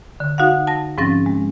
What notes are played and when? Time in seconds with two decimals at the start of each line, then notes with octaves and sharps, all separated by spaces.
0.20 D3
0.38 D#4 F#4 F5 F#5
0.67 A5 A#6
0.98 G#2 F3 C4 C#4 A6 A#6
1.26 G#3